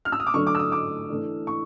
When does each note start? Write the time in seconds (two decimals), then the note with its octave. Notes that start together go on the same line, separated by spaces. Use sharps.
0.05 F6
0.12 E6
0.20 D#6
0.27 D6
0.34 D3 F#3 A3 D4 C#6
0.47 D6
0.55 E6
0.59 D#6
0.72 D6
1.09 E3 A3 D4
1.47 C#6